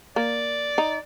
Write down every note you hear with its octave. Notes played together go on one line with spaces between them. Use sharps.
A#3 D5
D#4